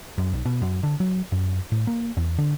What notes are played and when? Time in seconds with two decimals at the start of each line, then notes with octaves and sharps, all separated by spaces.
0.18 F#2
0.33 B1
0.45 B2
0.62 F#2
0.83 D3
1.00 F#3
1.32 F#2
1.72 A2
1.87 A#3
2.17 E2
2.38 D3